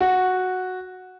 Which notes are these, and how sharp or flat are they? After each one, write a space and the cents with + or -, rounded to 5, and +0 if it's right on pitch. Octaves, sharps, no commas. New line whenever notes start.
F#4 -5